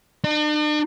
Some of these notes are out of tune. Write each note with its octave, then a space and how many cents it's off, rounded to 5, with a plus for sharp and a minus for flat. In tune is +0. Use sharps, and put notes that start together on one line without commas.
D4 +45